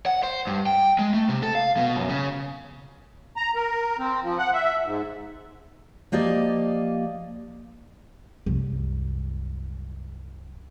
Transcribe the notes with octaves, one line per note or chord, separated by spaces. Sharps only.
F#5
C5
G2
G5
G#3
A3
C3
A4
F5
B2
F#2
C#3
A#5
A#4
C4
F3
F#5
E5
G#2
F3 A#3 G4 D5 D#5
C2 F#2